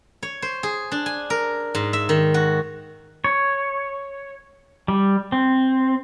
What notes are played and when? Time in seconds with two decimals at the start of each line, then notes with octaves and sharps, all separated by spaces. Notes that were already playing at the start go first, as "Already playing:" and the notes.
0.23 C#5
0.42 C5
0.63 G#4
0.92 D4
1.06 G#5
1.30 A#4
1.75 G#2
1.93 E5
2.09 D#3
2.34 F#4
3.24 C#5
4.88 G3
5.32 C4